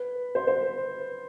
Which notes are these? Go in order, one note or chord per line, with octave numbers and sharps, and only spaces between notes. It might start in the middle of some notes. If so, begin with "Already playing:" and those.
Already playing: B4
C5
C5